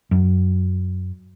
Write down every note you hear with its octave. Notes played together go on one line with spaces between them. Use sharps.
F#2